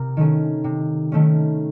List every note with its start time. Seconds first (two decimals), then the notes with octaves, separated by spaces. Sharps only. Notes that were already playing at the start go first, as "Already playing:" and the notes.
Already playing: C3 A#4
0.17 D#3 A3 C#4
0.64 C3
1.12 D#3 A3 C#4